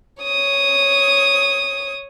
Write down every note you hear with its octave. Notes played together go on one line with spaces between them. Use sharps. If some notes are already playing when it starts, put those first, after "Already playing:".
C#5 D#6